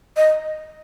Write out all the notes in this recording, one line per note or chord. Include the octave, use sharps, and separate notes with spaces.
D#5